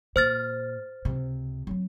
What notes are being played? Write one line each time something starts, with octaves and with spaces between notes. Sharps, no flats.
A#2 C5 F6 A6
C#2 C3
F#3 C4